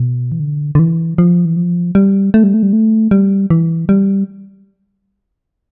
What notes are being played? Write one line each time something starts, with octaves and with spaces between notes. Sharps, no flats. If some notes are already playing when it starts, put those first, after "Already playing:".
Already playing: B2
E3
D3
D3
E3
F3
E3
F3
G3
A3
G3
A3
G3
A3
G3
E3
G3